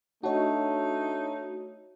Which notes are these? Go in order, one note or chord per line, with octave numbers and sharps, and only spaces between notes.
A3 D4 D#4 F#4 C#5 D#5 A5